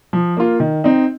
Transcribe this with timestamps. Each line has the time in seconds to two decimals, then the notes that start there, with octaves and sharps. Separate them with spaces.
0.13 F3
0.37 A#3 F4
0.60 D#3
0.84 C4 D#4